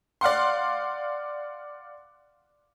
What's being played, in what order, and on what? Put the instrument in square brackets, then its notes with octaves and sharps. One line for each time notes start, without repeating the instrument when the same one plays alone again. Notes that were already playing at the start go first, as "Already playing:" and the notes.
[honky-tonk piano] D5 F5 F#5 C6